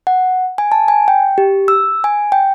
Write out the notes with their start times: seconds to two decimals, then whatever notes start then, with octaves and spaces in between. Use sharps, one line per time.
0.07 F#5
0.58 G#5
0.72 A5
0.88 G#5
1.08 G5
1.38 G4
1.68 E6
2.04 G#5
2.32 G5